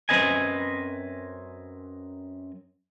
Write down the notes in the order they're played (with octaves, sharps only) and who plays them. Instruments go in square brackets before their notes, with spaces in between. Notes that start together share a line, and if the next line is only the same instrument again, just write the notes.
[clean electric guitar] F#2 A3 C4 B4 D#5 G#5